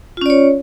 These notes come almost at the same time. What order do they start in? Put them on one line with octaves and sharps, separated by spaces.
F4 C#4 D5 C#5